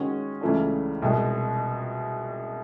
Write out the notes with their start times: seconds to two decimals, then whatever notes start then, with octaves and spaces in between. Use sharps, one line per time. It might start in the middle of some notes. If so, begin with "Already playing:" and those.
Already playing: D#3 G#3 C#4 F#4
0.41 C#2 C#3 E3 A3 D4
1.02 C2 B2 G#3